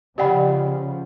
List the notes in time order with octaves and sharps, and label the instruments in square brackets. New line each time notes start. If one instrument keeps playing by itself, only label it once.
[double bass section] C#3 F3 [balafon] G4 D5 G5 [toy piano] D#5 F#5 B5